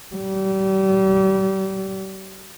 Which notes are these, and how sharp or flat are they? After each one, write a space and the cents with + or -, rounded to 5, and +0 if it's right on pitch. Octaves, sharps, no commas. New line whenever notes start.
G3 -35